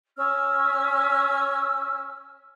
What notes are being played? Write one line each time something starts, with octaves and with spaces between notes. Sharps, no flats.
C#4 E6 F6